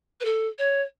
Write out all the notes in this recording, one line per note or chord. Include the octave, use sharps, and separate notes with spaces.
B4
A4
C#5